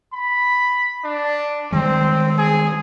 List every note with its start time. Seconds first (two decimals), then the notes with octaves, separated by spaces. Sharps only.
0.13 B5
1.05 D4
1.72 D#3 G3 G#3 C4
2.38 G#4